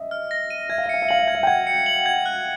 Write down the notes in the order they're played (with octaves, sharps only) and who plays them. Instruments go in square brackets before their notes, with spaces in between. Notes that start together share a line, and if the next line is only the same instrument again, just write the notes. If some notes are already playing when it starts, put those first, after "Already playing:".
Already playing: [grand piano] D#5 E5
[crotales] F6
A#6
D#7
[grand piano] E5 [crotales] G#6
[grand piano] F5
E5
[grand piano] F5 [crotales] C#7
[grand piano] E5
[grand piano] F5 [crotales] F#7
[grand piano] E5
[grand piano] F5 [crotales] G#6
[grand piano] E5
G5
[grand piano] F#5 [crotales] G#6
[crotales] C#7
F#7
G#6
F#6